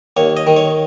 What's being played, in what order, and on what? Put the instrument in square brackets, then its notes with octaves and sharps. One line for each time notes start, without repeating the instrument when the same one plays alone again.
[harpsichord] D#2 C#5
D#5
D#3
C#5